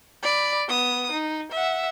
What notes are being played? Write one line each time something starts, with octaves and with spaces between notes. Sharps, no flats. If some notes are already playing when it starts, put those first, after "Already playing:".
D5 B5
B3 D#6
D#4
E5 F#5